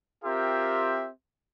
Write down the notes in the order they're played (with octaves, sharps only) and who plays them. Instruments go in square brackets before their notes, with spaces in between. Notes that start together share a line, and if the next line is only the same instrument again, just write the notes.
[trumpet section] C4 F4 G4 A#4 E5